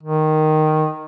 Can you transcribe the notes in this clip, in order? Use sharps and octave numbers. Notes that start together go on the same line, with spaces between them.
D#3